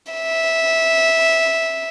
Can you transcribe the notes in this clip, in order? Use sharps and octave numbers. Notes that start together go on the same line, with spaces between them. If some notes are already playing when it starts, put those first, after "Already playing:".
E5